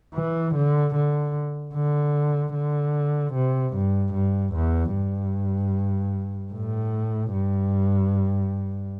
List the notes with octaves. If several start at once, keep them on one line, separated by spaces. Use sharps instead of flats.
E3
D3
D3
D3
D3
C3
G2
G2
E2
G2
A2
G2